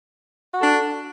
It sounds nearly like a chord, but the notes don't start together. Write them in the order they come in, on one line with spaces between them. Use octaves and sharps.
F#4 A4 D4